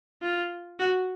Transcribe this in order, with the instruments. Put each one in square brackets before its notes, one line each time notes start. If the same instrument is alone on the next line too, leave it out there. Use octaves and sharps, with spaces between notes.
[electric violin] F4
F#4